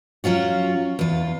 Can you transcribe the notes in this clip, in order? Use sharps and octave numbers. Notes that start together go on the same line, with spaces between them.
F#3 C#4 F4 F#4
E2 F4